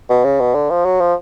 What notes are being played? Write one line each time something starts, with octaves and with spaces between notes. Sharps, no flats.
B2
C#3
B2
D3
F3
F#3
F3